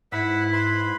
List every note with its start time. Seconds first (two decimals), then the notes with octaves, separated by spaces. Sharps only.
0.12 G#2 E4 B4 F#5 E6 B6
0.53 B4 B5 C6